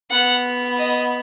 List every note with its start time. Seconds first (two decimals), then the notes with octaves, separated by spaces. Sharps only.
0.11 B3 F#5
0.79 D#5